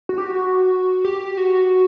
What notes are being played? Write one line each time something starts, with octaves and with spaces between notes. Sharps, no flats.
F#4
G4
F#4
G4
G4
F#4